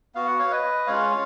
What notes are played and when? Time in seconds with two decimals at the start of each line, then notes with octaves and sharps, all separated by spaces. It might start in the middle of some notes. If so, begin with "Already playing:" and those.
0.15 B3 F#4 F5
0.27 F#5
0.39 C#5 F5
0.51 B4 D#5
0.87 G#3 C#4 F4 C#5 F5